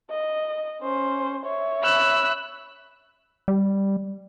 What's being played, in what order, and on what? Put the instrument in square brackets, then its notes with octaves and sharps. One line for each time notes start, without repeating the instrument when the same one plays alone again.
[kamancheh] D#5
C#4 C5
C#5 E5
[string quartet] B5 E6 F#6
[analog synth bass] G3